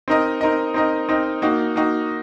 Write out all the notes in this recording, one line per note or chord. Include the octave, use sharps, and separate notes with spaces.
C4 D#4 A#4 D#5
C4 D#4 A#4 D#5
C4 D#4 A#4 D#5
C4 D#4 A#4 D#5
A#3 D#4 F#4
A#3 D#4 F#4